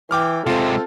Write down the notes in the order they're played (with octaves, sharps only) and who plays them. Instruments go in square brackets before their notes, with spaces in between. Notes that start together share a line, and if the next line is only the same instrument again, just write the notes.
[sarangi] E3 [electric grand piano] G5 D6 F6
[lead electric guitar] C3 G#3 [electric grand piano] C4 F4 [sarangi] A4